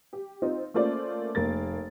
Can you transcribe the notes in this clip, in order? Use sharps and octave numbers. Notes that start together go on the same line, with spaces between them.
G4
C4 D#4 F4
A3 A#3 C#4 F4 C5 D5
F1 A#3 A6